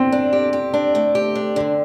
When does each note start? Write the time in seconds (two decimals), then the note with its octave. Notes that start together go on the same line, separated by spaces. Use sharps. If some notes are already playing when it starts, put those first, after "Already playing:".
Already playing: D3 C4
0.12 D4
0.33 G4
0.53 G4
0.74 D4
0.95 A3
1.15 G4
1.35 D4
1.56 D3